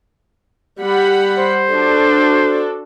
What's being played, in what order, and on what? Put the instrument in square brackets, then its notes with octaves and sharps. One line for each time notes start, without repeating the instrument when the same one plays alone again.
[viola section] G3 F#5 B5
[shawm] C5
[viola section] D4 F#4 A4